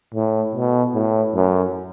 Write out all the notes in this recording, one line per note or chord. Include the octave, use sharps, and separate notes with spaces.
A2
B2
A2
F#2